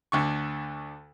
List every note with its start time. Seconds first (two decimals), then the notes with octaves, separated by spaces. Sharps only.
0.12 D2 D3 C#6